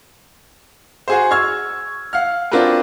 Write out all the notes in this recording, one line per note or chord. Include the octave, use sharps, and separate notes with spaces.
F#4 G#4 C5
C#6 E6 F6 G#6
F5 F#5 F6
C4 D4 F4 F#4 A#4 B4